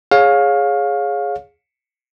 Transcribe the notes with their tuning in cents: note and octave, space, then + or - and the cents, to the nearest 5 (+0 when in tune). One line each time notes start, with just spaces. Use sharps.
G#4 +0 C#5 +0 F5 +20